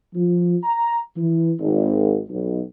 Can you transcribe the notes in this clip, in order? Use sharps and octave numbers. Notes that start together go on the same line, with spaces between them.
F3
A#5
E3
G#1
B1